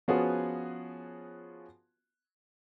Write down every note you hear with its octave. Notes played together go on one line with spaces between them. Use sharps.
F3 B3 C#4 F4 F#4 G#4